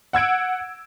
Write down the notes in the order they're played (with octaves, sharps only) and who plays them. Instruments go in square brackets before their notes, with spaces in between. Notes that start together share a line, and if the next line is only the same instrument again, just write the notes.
[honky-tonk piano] F#5 E6 G#6 D7